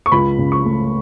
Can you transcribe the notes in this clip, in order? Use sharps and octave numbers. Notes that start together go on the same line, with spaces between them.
C#6
C#2 B5
C#3
C#6
A3